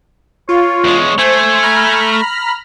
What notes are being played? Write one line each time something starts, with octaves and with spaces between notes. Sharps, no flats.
F4 C#5
E2 G#3
A3 C5 G#5
A#5 B5 F6